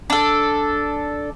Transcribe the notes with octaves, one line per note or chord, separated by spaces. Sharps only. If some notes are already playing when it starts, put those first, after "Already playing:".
D4 A4